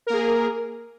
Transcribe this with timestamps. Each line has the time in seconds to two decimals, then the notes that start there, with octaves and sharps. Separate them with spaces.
0.07 A#4
0.10 A#3
0.13 G#4